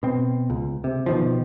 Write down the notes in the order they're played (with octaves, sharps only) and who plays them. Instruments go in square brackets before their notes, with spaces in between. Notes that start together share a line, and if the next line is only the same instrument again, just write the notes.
[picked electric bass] B2 C4
C#2
C3
B2 D#3 F3